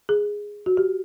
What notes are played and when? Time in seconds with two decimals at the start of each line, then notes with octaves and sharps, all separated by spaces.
0.09 G#4
0.66 F#4
0.77 G4